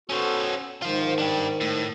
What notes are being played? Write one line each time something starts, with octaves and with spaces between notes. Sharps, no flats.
B3 C#4 F#4 A4 C5
G#2 D#3 F4 C5
D4 G4
A2